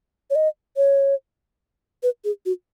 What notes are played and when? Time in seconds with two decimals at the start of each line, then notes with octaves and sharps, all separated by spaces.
0.30 C#5
0.35 D#5
0.77 C#5
2.03 B4
2.24 G#4
2.46 F#4